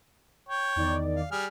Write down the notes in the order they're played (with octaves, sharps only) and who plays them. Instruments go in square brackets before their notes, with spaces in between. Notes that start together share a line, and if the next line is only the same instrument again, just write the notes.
[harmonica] C#5 G5
[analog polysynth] E2 D#3 D5
[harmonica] F5
G3 G#4 F6